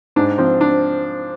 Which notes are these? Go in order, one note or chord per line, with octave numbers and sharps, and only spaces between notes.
G#2 D4
F3 C4
D4